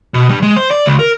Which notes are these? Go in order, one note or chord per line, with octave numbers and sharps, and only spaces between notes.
B2
G2
G#3
C5
D5
C#2
A#4